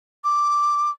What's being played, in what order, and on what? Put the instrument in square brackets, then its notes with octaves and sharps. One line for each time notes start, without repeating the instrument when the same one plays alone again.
[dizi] D6